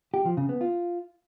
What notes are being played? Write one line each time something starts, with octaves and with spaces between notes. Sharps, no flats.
G4
F3
C#3
B3
F4